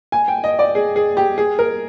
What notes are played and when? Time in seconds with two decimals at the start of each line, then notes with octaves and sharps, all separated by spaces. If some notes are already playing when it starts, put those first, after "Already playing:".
0.12 G#5
0.28 G5
0.44 D#5
0.59 D5
0.75 G#4
0.96 G#4
1.17 G4
1.38 G#4
1.59 A#4